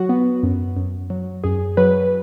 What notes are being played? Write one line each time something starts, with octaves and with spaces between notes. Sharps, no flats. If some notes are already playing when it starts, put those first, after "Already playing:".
Already playing: F#3 F#4
B3
F#2
F#2
F#3
F#2 G#4
F#3 B4